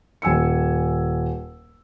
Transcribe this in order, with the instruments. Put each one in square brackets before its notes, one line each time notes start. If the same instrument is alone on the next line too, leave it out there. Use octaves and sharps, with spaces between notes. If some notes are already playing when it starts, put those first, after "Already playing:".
[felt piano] D#1 G#5 E6 C#7